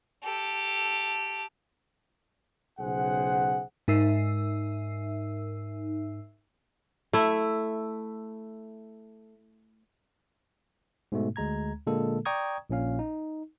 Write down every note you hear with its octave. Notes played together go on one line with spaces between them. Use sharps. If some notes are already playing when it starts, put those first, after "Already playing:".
G4 A4
B1 C#3 G#4 C5 F#5
G#2 D#4 A#4 E5 E6 C7
A3 E4
G#2 B2 A3
D2 G#3 A#5 G#6
A#2 D3 G#3 A#3 A4
D5 G5 A#5 C#6 D#6 G#6
A#1 A#2 C#4 F5
D#4